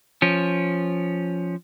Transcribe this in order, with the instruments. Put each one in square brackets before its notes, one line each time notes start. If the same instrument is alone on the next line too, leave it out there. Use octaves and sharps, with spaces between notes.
[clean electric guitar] F3 C#4